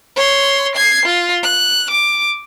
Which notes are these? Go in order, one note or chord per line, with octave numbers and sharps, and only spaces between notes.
C#5 C6
G#6 C7
F4
F#6
D6